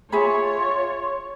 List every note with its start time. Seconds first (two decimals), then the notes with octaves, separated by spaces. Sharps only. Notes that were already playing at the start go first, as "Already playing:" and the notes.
0.12 F4 G#4 C#5 E5 B5